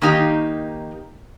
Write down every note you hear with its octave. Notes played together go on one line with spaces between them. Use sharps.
D#3 A#3 D#4 G4